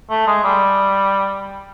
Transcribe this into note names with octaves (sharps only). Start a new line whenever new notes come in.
A3
G#3
G3